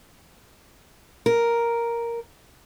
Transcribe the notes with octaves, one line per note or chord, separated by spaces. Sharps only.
A#4